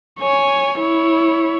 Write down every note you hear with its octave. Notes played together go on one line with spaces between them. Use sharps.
C#5 G#5
E4 C#5